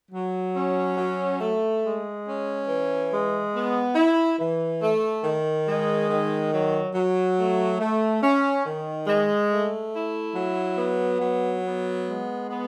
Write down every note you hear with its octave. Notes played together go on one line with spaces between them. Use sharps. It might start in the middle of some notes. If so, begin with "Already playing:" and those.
F#3
C#4
F#3
A3
G#3
C#4
E3
G#3
B3
E4
E3
A3
D#3
G#3
D#3
F#3
F#3
A3
A3
C#4
D#3
G#3
A3
E4
F#3
B3
F#3
B3
G#3
B3